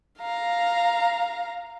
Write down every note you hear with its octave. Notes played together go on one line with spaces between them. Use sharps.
F5 A#5